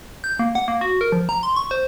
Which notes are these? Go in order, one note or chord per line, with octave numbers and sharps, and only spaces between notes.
G6
A#3
F#5
A#3
F#4
A#4
F3
A#5
C6
C#6
C5